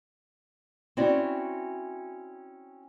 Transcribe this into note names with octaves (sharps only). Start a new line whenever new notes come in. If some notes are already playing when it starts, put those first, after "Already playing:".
C4 C#4 E4 F#4 D5